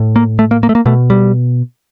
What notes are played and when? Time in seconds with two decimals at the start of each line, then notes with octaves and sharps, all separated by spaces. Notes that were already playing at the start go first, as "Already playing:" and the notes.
Already playing: A2
0.16 A#3
0.39 A3
0.51 A#3
0.63 A#3
0.69 A3
0.75 A#3
0.86 B2 A3
1.10 G3